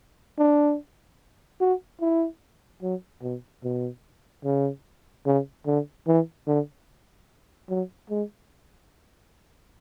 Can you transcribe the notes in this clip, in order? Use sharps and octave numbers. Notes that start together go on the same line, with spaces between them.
D4
F#4
E4
F#3
B2
B2
C#3
C#3
D3
E3
D3
F#3
G#3